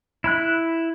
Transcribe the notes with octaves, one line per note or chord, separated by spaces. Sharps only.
E4 B5 F#6